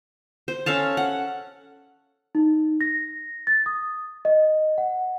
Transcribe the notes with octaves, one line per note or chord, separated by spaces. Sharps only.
C5
C#4 A4 F5 A5
F#5
D#4
A#6
A6
D#6
D#5
F#5